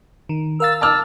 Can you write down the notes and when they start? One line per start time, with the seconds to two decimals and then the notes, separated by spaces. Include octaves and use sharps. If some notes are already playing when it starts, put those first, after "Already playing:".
0.29 D#3
0.60 A#4 F5 E6 A6
0.81 A5 D6 E6 F6